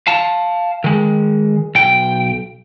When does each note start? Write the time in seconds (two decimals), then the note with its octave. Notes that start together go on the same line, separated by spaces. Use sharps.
0.07 F5 A5
0.84 D#3 G#3
1.75 B1 G5